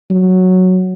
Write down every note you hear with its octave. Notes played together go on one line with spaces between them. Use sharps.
F#3